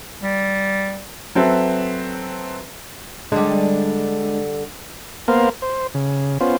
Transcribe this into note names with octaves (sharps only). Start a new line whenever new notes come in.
G3
F#3 C4 A4 B4 E5
D3 G3 G#3 D4
A#3 B3 A#4 C5 F5
C5
C#3
B3 C#4 F4 C5